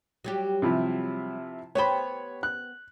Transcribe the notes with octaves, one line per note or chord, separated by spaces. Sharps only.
F#3 G3 G4
C3 F3 E4
B3 G4 C5 C#5 B5
F#6